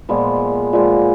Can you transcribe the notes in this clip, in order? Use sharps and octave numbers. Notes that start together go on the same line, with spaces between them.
A#2 F3 G#3 B3
A#2 F3 G#3 B3